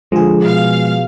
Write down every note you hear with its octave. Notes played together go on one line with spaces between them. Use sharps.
D3 F3 G#3 G#4
B2 F5